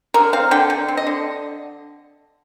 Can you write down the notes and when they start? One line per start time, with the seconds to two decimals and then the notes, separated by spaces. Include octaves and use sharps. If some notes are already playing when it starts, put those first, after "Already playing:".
0.14 D3 A#4
0.33 C4 F5
0.51 D3 G5
0.70 D3
0.88 C4
0.97 D#5
1.07 D3